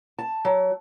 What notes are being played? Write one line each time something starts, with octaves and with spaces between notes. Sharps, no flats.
A5
F#3